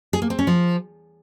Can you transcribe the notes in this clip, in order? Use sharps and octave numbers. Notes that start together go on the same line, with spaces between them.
G#4
A#3
C4
C#4
F3